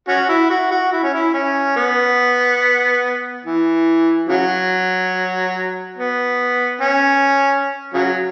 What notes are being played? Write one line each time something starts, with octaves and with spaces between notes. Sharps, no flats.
C#4 F#4
E4
F#4
F#4
E4
C#4
E4
C#4
B3
E3
C#3 F#3
B3
C#4
C#3 F#3